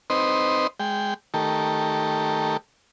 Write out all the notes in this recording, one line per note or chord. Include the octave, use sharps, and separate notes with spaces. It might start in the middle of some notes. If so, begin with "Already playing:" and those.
C4 D#4 B4 C5 D#5
G#3 G5
D#3 A3 G4 A4 A#4